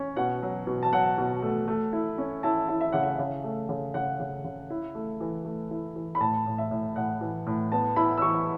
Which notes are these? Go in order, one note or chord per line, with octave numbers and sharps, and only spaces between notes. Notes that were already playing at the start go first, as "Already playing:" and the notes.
Already playing: C#4
B2 F#5
F#3
B2
A5
F#3 F#5
B2
A3
A3
E4
C#4
E4 A5
E4
E5
C#3 F#5
E5
C#3
A3
C#3
C#3 F#5
C#3
C#3
E4
A3
E3
A3
E4
E3
B5
A2 A5
A2
E5
A2
A2 F#5
E3
A2
B3 A5
E4 B5
E6
E3 C#6